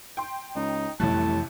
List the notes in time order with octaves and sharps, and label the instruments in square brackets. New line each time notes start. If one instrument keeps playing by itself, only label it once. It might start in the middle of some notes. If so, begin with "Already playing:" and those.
[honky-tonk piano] G5 C6
[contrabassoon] C#2 [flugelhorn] D#4
[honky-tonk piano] A1 C3 F#6 [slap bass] F2 E3 G3 [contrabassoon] A2 [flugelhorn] A5